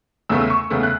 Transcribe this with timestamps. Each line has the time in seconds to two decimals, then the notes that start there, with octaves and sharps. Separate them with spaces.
0.29 E2 C#3 A3 E6
0.41 E6
0.50 C#6
0.70 E2 C#3 A3
0.83 F#6